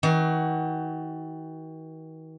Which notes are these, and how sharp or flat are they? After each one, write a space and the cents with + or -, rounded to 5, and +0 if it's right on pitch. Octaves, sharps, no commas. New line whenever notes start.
D#3 +45 F#4 +30